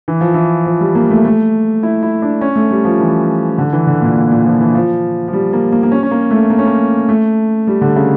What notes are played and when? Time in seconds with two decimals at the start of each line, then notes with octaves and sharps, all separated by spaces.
0.08 E3
0.21 F3
0.34 E3
0.66 F3
0.81 G3
0.95 A#3
1.10 A3
1.25 A3
1.83 E4
2.03 E4
2.22 D4
2.41 C#4
2.56 A3
2.71 G3
2.85 F3
3.00 E3
3.58 D3
3.73 E3
3.87 D3
4.02 A#2
4.16 A#2
4.31 A#2
4.46 F3
4.60 E3
4.75 F3
5.28 F3
5.33 G3
5.53 A#3
5.72 A#3
5.83 A#3
5.92 C#4
6.03 C#4
6.11 A#3
6.31 A3
6.50 A#3
6.59 C#4
6.66 A#3
7.09 A3
7.67 G3
7.81 D3
7.96 C#3